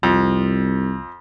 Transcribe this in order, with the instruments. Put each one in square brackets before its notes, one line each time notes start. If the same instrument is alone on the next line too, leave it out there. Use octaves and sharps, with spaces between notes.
[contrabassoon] C2 [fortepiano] F2